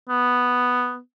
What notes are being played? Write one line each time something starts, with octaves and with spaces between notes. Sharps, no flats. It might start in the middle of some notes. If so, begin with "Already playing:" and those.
B3